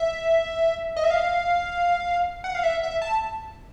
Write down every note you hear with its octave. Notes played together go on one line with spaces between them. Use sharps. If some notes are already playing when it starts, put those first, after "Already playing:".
Already playing: E5
D#5
E5
F5
F#5
F5
E5
E5
A5